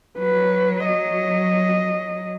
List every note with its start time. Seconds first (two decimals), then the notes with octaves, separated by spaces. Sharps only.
0.19 F#3 B4
0.85 D#5